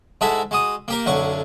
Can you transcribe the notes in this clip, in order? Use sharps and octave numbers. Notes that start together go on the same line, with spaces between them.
G#2 G#3 E4 F#4 A4 E5
G#3 F#4 D#6
A#3 G4 A#4
B1 F#2 D3 F#5 C#6